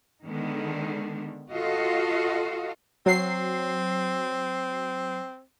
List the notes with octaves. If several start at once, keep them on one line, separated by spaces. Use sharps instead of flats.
D3 D#3 G#3 B3 D4
F4 F#4 A4 D#5 F5
F#3 C4 C7